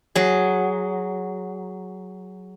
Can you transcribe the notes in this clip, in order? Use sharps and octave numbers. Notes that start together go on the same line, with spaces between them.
F#3 G#4